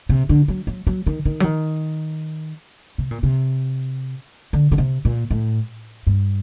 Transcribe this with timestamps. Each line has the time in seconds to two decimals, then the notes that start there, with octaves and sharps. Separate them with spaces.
0.09 C3
0.29 D3
0.48 F#3
0.67 F#3
0.87 F#3
1.07 D#3
1.25 D#3
1.40 F#3
1.44 D#3
2.98 C3
3.11 A#2
3.23 C3
4.53 D3
4.72 D3
4.78 C3
5.05 A#2
5.31 A2
6.07 G2